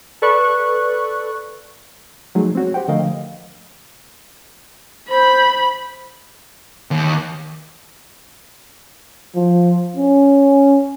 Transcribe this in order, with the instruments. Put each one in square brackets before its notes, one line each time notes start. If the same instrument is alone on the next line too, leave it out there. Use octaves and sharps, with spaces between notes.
[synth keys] A4 B4 D5 C#6 F#6
[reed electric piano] F3 F#3 G#3 A3 D#4 G#4
C4 F#4 C#5
G4 C5 F#5 G5
D3 F3 A3 A#4 D#5 F5
[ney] C5 [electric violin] B5
[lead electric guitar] D#2
[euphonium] F3
C#4